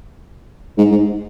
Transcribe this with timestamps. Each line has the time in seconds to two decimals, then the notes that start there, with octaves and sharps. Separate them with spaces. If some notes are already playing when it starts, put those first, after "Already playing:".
0.78 G#2
0.91 G#2